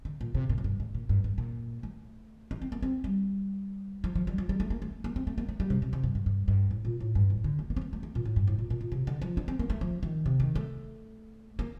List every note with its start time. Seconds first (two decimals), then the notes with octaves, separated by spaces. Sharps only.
0.05 D3
0.21 A#2
0.35 C3
0.49 A#2
0.58 A2
0.64 G2
0.80 A2
0.94 A#2
1.09 G2
1.24 G2
1.38 A#2
1.83 A3
2.51 D4
2.62 C4
2.72 A#3
2.82 C4
3.04 G3
4.04 F3
4.15 F3
4.27 G3
4.38 F3
4.49 G3
4.60 A3
4.70 A#3
4.82 A3
5.04 A#3
5.16 C4
5.27 A3
5.38 A#3
5.49 A3
5.60 G3
5.70 C3
5.82 C3
5.93 C3
6.03 G2
6.15 G2
6.26 G2
6.48 G2
6.71 A2
6.85 A#2
7.00 A2
7.15 G2
7.30 A2
7.44 D3
7.59 A3
7.70 A#3
7.76 C4
7.82 A#3
7.93 A3
8.03 A3
8.15 A#2
8.25 A2
8.36 G2
8.47 A2
8.59 A#2
8.70 A#2
8.81 A#2
8.92 C3
9.07 D3
9.22 F3
9.37 D4
9.48 C4
9.59 A#3
9.70 A3
9.81 F3
10.03 D#3
10.26 C3
10.40 D#3
10.55 A3
11.59 A#3